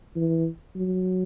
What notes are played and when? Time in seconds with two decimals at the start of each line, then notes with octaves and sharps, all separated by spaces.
0.16 E3
0.76 F#3